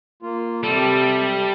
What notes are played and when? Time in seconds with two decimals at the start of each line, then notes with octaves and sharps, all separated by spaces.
0.22 A#3 F4
0.63 C3 G3 A4